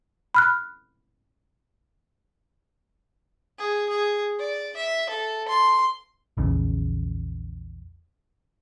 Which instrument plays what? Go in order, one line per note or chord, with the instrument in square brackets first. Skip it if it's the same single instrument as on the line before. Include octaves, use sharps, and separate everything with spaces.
[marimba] B5 F6 F#6
[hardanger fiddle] G#4
G#4
D5
E5
A4
C6
[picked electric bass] A#1 E2 C#3